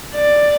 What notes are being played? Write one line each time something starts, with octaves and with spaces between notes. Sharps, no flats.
D5